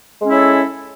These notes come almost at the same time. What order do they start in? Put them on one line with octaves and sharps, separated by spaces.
G#3 C#4 E4 C#5 A4